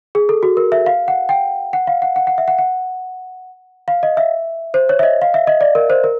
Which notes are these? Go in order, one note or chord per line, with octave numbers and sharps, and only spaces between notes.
G#4
A4
F#4
A#4
E5
F5
F#5
G5
F#5
F5
F#5
F#5
F#5
E5
F#5
F#5
F5
D#5
E5
C5
C#5
E5
D#5
F5
E5
D#5
D5
A#4
C5
A#4